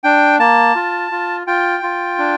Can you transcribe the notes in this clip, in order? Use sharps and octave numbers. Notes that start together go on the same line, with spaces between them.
D4 G5
A#3 A5
F4
F4
F4 G5
F4
D4